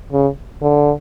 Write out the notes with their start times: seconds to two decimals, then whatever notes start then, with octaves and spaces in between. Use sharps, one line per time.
0.13 C#3
0.62 D3